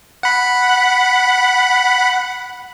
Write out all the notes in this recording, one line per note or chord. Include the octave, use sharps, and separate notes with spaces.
F#5 B5